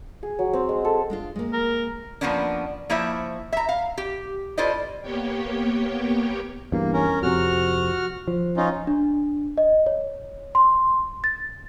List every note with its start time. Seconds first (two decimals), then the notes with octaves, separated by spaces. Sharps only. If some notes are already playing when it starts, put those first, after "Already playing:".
0.23 G#4
0.39 F#3
0.53 C4
0.69 G#3
0.85 A4
1.10 G#3 D4 F4
1.36 G#3 A#3
1.53 A#4
2.21 F3 G#3 A#3 B3 C#4 D4
2.90 F3 A#3 E4 C5 C#5 E5
3.53 E5 A#5
3.69 F5
3.98 G4
4.58 E4 F4 A4 C5 D5 D#5
5.01 A#3 B3 G4 C#5 G5
6.72 E2 G2 A#3
6.93 C#4 A#4
7.23 F2 C3 F#4 F6
8.28 F3
8.57 C#4 D#4 F4
8.87 D4
9.58 D#5
9.86 C#5
10.55 C6
11.24 A6